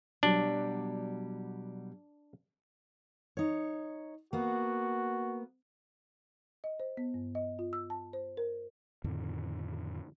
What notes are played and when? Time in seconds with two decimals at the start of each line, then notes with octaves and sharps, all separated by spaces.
0.23 B2 F#3 G3 D4
3.37 D#4 C#5
4.33 A#3 B3 F#4
6.64 D#5
6.80 C5
6.97 B3
7.14 G2
7.35 D#5
7.59 F4
7.73 E6
7.90 A5
8.13 C5
8.37 A#4
9.04 F2 A2 D3 D#3